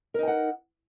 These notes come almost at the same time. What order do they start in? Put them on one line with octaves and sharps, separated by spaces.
A#4 D#4 G5 F#5